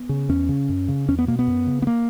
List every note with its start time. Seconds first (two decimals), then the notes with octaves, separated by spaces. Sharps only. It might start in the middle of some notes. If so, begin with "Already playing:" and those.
Already playing: B3
0.09 C#3
0.29 E2 C#4
0.49 C#3
0.69 F#2
0.88 C#3
1.08 E2 C#4
1.19 B3
1.27 B2 A#3
1.39 B3
1.47 F#2
1.67 C#3
1.82 B3
1.87 A#3